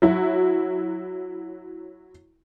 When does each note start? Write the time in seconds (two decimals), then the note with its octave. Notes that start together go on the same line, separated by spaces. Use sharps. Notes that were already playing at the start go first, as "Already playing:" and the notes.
0.02 F#3 E4 F#4